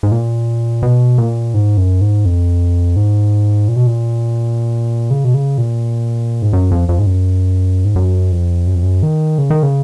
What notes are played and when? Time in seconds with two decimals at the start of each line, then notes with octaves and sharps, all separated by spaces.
0.03 G#2
0.12 A#2
0.83 B2
1.18 A#2
1.54 G#2
1.77 F#2
2.01 G#2
2.25 F2
2.96 G#2
3.68 A#2
3.76 B2
3.87 A#2
5.11 C#3
5.25 B2
5.34 C#3
5.58 A#2
6.42 G#2
6.53 F#2
6.71 F2
6.89 F2
6.99 G#2
7.06 F#2
7.85 G#2
7.96 F#2
8.31 F2
8.67 F#2
8.75 F2
8.83 F#2
9.03 D#3
9.38 C#3
9.50 D#3
9.63 C#3